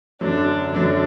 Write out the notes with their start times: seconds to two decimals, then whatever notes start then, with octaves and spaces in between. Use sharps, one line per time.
0.21 F#2 D3 F#3 D4
0.73 F#2 D3 F#3 D4